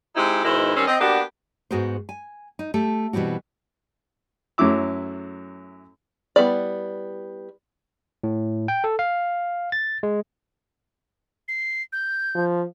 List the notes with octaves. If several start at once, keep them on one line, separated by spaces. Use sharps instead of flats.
G#3 C4 D#4 E4 G4
G#2 B2 D#3 E4 C5
D#3 G3 C4 C#4
C4 D#5
A#3 B3 D4 F#4 G4
G#2 B3 F#4 G#4 A#4 C5
G#5
D#4
A3 G4 A4
B2 E3 G3 C4 F#4
F#2 F#3 A3 E4 D6 E6
G3 B3 E4 D5
A2
G5
A4
F5
A6
G#3
C7
G6
F3